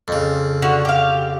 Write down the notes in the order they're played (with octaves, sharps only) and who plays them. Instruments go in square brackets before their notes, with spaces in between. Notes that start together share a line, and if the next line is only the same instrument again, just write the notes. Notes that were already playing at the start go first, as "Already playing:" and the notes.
[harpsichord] F2 C#3
[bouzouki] D3 F#4
G4 F5